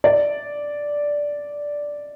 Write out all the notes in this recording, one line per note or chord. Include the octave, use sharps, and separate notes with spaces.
D5